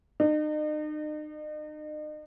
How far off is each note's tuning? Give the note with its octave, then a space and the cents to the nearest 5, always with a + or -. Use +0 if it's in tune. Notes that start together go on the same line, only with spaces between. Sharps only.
D#4 -40